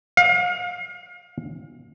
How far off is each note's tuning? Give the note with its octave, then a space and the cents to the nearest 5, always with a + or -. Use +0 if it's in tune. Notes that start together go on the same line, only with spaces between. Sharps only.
F5 +35